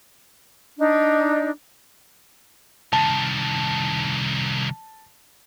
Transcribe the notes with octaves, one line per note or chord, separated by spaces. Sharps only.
D4 D#4
C2 D#3 A5